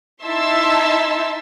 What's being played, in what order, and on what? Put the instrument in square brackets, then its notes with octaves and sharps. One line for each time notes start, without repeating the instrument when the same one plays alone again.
[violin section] D#4 E4 E5 A5 C6 E6